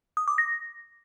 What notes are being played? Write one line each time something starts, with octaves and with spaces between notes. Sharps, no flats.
D#6
D6
A#6